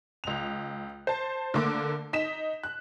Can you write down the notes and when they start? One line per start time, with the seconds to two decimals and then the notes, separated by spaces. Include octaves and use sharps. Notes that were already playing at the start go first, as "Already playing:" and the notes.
0.24 C#2 F7
1.07 C5 A5
1.54 D3 A3 A#3 D6
2.13 D#4 B6 E7
2.63 F#6